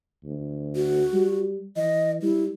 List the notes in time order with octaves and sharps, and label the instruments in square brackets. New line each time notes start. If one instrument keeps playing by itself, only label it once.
[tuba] D2
[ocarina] F#4
[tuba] G3
[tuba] E3 [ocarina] D#5
[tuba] G3 [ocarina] E4